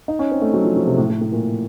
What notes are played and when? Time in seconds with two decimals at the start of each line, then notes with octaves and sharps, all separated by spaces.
0.08 D#4
0.19 C#4
0.32 C4
0.42 A3
0.54 F#3
0.64 F3
0.76 F3
0.86 C3
0.98 A2
1.09 A2
1.21 A2
1.32 A#2